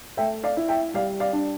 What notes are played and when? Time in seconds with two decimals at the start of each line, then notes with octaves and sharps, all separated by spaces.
0.17 A3 E5 G5
0.44 D5 F5
0.57 E4
0.69 E5 G5
0.94 G3 D5 F5
1.20 D5 F5
1.33 D4